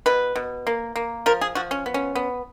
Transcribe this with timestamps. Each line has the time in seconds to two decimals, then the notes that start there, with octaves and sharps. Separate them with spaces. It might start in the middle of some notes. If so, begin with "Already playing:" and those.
0.06 B2 B4
0.36 B2
0.67 A#3
0.96 A#3
1.26 F3 A#4
1.41 G#4
1.55 F3 F#4
1.71 C#4
1.86 B3
1.94 C#4
2.15 B3